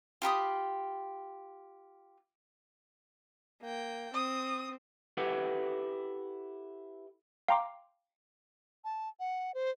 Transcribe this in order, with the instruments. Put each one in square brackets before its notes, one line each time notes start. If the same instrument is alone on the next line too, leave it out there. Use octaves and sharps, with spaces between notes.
[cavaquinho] F4 G4 B5 D#6
[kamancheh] A#3 G5
[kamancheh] C4 [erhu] D#6
[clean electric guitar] E4 G4 A4 B4 F#5
[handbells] F5 G5 A#5 C6 D6
[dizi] A5
F#5
C5